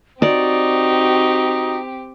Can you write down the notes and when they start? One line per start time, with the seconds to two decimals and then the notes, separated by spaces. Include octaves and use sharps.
0.22 C4 D#4 F#4 G4 D5